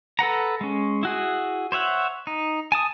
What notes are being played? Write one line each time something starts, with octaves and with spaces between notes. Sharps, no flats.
A4 B4 F#5 A#5
G#3 C#4
E4 F#4 G#4
C5 C#5 E5 F#5
D#4
G#5 A5 D#6